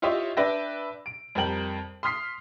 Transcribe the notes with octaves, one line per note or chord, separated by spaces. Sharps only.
E4 F4 G4 C#5 D#5 E5
D4 B4 E5 G5 A#6
D7
F2 G3 A#4 G5 F#7
C6 D#6 F6 B6 C7